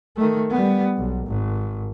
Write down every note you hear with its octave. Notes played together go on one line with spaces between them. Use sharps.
D#3 A3
G3 B3
B1
G#1